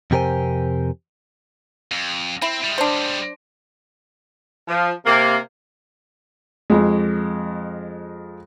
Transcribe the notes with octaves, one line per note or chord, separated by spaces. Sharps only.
F2 C3 G4 A#4 C5 G#5
F2
C4 E4
G3 G#3
D4 C5
F3
C3 A#3
F2 G#3